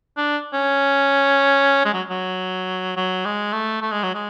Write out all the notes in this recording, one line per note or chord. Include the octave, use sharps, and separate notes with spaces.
D4
C#4
G#3
F#3
F#3
F#3
G#3
A3
A3
G#3
F#3
G#3